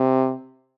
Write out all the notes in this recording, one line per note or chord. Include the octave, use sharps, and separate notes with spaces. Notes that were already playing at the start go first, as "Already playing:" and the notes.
Already playing: C3